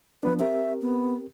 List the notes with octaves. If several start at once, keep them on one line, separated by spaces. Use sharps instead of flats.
F3 B3 D4 B4
C4 G4 A#4 E5
B3